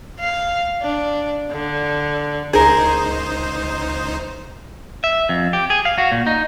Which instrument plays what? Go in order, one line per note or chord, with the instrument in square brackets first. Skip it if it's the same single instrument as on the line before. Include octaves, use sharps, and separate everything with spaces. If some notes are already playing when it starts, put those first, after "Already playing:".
[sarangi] F5
D4
D3
[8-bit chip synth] C#2 D#4 C5 [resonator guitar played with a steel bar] G#4 A#4
[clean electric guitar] E5
F2
G4
G#4
F5
F#4
A#2
D#4